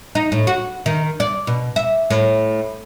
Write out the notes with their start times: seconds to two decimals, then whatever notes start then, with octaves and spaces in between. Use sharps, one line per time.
0.15 D#4
0.32 A2
0.47 F#4
0.86 D#3
1.20 D5
1.47 B2
1.76 E5
2.10 A2